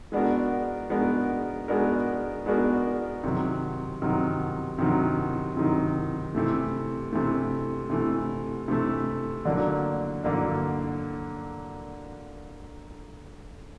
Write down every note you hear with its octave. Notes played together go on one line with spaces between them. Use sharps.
G#3 B3 D4 F#4 A#4
G#3 B3 D4 F#4 A#4
G#3 B3 D4 F#4 A#4
G#3 B3 D4 F#4 A#4
C3 D#3 F#3
C3 D#3 F#3
C3 D#3 F#3
C3 D#3 F#3
C3 E3 A3
C3 E3 A3
C3 E3 A3
C3 E3 A3
D3 F#3 A#3 D4
D3 F#3 A#3 D4